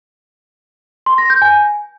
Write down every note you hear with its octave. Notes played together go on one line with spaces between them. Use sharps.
C6
A#6
G6
G#5